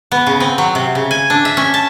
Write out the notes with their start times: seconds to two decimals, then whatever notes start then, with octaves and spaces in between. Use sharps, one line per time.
0.12 B3
0.27 C#3
0.40 C4
0.58 F#3
0.75 C3
0.95 C#3
1.11 G#5
1.30 D4
1.45 E5
1.57 C#4
1.74 A5